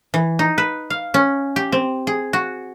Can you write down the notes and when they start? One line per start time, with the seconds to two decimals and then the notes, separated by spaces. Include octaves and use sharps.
0.14 E3
0.39 D#4
0.58 B4
0.90 F5
1.14 C#4
1.56 G4
1.72 C4
2.07 G#4
2.33 F#4